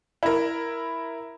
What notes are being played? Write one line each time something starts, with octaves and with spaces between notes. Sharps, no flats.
E4 A#4